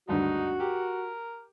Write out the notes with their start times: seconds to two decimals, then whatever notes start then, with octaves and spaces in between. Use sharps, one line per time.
0.08 G#1 D2 G2 D#4 F#4
0.60 G4 A#4